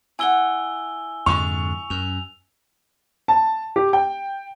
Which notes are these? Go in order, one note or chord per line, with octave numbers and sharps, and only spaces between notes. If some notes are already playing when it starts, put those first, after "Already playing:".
E4 F#5 G#5 E6 G7
F2 G#2 D3 C#6 F7
F#2 F7
A5
G4
G5